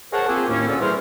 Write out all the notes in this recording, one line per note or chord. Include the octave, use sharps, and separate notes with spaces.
G#4 A#4 C5 C#5 F#5 A5
A#3 C4 F4 G4 G#4
D#2 A2 A#3 C#4
D2 A#2 C#4 F#4 A4 D5
E3 G3 G#4 A#4 C5